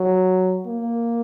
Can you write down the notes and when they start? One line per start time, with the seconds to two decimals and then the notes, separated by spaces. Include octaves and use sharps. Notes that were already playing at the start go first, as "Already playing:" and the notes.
Already playing: F#3
0.67 A#3